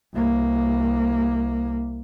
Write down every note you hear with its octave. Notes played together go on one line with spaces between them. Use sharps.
C2 A#3